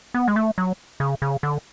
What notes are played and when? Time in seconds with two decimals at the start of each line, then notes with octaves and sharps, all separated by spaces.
0.14 B3
0.28 G#3
0.36 A3
0.58 F#3
1.00 C#3
1.22 C#3
1.43 D3